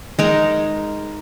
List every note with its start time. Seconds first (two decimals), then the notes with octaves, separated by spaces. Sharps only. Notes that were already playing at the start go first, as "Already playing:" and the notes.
0.19 G#3 D#4 A#4